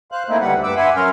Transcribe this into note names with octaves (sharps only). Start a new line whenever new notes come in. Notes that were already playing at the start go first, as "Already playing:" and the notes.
C5 F5 F#6
A3 A#3 C4 D#4 E4
D2 G3 B4 F#5
G2 B4 D6 E6
E5 F#5 G#5 B5 C6
F#3 C#4 A#4 C6 F6